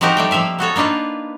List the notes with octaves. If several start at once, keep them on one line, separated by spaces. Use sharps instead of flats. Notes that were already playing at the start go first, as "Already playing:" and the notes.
F3 C4 D#4 F#4 G4 A#4
G3 A3 G5
F3 A#3 E5 F5
B3 F#4 A4 C#5
A#3 D4 D#4 F4 B4